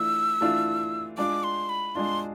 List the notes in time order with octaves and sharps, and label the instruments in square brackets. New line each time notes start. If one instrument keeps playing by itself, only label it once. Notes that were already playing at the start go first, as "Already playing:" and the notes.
Already playing: [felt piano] E3 A3 D4 F4 [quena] E6
[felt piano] E3 A3 D4 F4
[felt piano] G#3 D4 F4 [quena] D6
[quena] C6
B5
[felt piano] G#3 D4 F4 [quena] C6